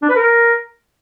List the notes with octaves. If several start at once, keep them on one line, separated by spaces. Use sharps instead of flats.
D4
B4
A#4